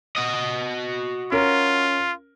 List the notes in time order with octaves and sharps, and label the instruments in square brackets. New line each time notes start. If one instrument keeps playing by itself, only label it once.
[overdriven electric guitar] F#4 D#5
[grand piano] C#4 A#4 [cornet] F4